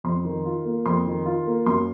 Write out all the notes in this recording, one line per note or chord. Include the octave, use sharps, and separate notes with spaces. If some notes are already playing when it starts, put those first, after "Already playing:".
F2 C6
D#3
F4
A#3
F2 C6
D#3
F4
A#3
F#2 C6